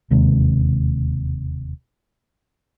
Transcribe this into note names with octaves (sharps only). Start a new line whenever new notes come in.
E1 D#2 C3 G#3